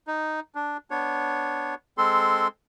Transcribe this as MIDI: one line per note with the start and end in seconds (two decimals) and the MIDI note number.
0.07 0.40 63
0.55 0.77 62
0.91 1.75 59
0.91 1.75 62
0.91 1.75 73
1.98 2.48 56
1.98 2.48 60
1.98 2.48 69
1.98 2.48 84